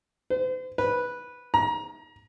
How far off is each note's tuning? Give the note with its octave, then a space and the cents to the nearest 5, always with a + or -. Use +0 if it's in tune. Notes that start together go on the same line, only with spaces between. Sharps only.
C5 -40
B4 -10
A#5 +30